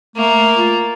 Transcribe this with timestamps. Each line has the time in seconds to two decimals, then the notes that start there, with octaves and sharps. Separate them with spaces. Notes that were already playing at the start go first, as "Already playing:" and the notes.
0.16 A3 A#3
0.57 F4